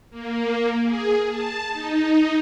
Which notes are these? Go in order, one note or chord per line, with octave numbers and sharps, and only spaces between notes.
A#3
G#4
A5
D#4